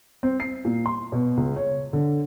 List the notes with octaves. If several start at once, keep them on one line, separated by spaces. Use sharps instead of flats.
C4
C7
A#2
C6
B2
C#2
C#5
D3